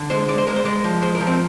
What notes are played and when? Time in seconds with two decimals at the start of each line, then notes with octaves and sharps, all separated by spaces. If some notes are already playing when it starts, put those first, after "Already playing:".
Already playing: D3
0.10 G#3 C5
0.28 G#3 D5
0.38 C5
0.47 G#3 A#4
0.56 C5
0.65 G#3 D5
0.84 F3
1.02 G#3 C5
1.15 A#4
1.20 F3
1.27 C4